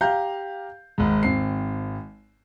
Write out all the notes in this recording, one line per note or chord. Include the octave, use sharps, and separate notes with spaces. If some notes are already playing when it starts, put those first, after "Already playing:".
G4 F5 A#5 G6
G#1 G#2
G#1 C4 C7